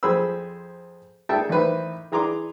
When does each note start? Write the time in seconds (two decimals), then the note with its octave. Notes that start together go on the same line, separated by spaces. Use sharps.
0.03 F2 G#4 C5 B5 E6
1.29 G#4 A4 E5 G5 A5
1.49 A1 D#3 B4 C5
2.12 E3 G#4 A#5 C6 D6